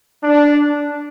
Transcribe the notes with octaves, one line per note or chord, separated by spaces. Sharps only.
D4